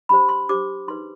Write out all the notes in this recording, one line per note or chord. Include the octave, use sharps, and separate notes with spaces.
D4 G4 C5 B5
C6
D4 G4 C5 D6
D#4 G#4 B4 C6